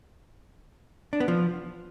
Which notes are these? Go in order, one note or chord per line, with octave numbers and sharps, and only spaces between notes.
D4
B3
F3